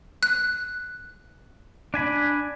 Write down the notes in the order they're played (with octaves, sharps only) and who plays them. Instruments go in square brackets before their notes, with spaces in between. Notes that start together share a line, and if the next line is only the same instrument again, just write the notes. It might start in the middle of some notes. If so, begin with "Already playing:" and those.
[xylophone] F#6
[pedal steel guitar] D4 G#5 B5